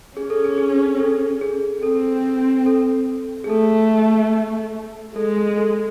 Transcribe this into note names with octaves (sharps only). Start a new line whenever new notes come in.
C#4 G#4
A4
G#4
G#4
A4
G#4
C4 A4
A4
G#4
A3 A4
G#3 A4
A4